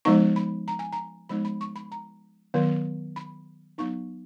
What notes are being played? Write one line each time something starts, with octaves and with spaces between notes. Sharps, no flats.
F3 G#3 B3 D#4 C#6
B5
A#5
G#5
A#5
F3 G#3 B3 D#4 B5
B5
C#6
B5
A#5
D#3 F#3 B3
B5
F#3 B3 D#4 C#6